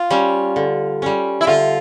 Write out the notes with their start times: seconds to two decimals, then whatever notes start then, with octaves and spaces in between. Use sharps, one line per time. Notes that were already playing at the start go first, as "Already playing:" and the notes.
Already playing: F4
0.10 G3 C#4
0.56 D3
1.02 G3 C#4
1.41 E4
1.47 D3 F4